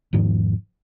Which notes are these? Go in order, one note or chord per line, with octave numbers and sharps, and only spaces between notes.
E1 G#2 D#3 F3